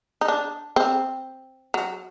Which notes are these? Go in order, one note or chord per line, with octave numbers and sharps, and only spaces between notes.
D#4
D4
C4
F#3